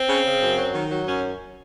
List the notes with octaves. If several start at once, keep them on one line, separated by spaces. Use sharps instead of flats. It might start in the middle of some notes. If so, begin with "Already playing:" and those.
Already playing: C4
C#3
C#3
F#2
F#3
D#3
F#3
F#2 C#4